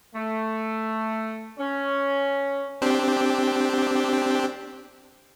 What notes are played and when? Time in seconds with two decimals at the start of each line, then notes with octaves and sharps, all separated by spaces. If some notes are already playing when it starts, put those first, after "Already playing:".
0.15 A3
1.58 C#4
2.82 C4 D4 G4